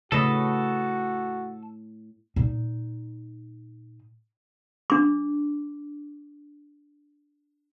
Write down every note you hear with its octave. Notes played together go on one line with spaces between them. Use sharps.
A2 C#3 A3 F#4 A4 B4 D#5
A#2 D#4
D4 D6